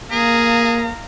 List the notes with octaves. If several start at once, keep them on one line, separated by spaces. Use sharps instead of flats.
A#3 G#4 F5 A#5